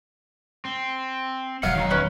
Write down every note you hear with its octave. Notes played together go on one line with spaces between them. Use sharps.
C4
E1 F#3 F5 F#5
D#3 D#4
C#4 B4